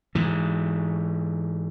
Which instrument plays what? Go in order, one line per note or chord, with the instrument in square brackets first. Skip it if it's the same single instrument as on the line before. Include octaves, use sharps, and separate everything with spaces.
[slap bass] G#2 E3